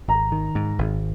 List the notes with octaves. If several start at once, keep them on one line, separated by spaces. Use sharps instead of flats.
G#1 A#5
D#3
G#2
G#1